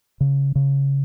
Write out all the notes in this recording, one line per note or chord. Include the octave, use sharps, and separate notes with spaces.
C#3
C#3